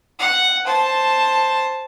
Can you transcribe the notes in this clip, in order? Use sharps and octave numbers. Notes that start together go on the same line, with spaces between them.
F#5
C5 A5